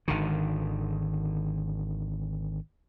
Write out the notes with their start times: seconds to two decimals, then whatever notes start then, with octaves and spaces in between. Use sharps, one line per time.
0.08 G#1 D3 D#3